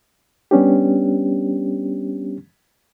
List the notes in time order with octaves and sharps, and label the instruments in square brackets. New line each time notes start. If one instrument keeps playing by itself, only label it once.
[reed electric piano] G3 B3 C#4 D4 G4